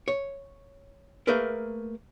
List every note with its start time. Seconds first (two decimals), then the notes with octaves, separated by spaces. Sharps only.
0.08 C#5
1.27 A3 A#3 G#4 A#4 B4